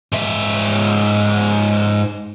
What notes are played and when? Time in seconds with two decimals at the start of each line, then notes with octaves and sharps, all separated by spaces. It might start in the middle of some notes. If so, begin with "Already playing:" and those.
0.12 G#2 E5